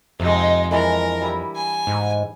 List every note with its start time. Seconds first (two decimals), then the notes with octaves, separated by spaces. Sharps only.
0.20 F2 C3 G#3 D#4
0.71 E3 G#3 D4 A#4
1.22 G3 E4 G4
1.56 G#5
1.87 G#2